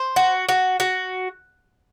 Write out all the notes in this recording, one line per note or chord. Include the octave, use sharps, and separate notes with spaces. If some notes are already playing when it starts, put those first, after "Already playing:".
Already playing: C5
F#4
F#4
F#4